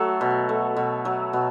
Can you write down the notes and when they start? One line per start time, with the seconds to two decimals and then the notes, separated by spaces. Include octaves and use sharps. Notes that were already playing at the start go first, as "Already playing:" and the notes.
Already playing: F#3 A3 F#4 A4
0.21 B2
0.49 A3
0.77 B2
1.05 F#3
1.33 B2